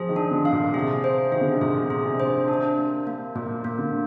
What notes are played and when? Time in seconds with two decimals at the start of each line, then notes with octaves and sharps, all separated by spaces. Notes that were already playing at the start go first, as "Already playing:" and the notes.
Already playing: F3 G#4
0.09 D#3
0.16 D4
0.31 D3
0.45 F5
0.53 A#2
0.74 C3 G#4
1.04 C5
1.31 D#3 G#4
1.41 D3
1.51 C3
1.61 A#2 G#4
1.90 G#4
2.05 C3
2.20 C5
2.48 D4
2.78 A#3
3.07 A#3
3.35 A#2 A#3
3.64 A#3
3.78 D3